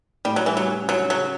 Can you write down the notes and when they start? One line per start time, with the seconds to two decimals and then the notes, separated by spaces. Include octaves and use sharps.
0.25 A2 G3
0.36 F#3
0.46 E3 G3
0.57 F#3
0.67 C#4
0.89 F#3 C#4
1.10 C#3 F#3